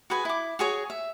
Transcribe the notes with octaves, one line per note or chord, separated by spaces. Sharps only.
F#4 G#4 B4 G#5
E4 D6
F#4 G#4 C#5
E5